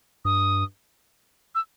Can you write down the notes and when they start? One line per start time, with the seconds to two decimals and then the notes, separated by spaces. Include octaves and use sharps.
0.25 G2 D#6
1.55 E6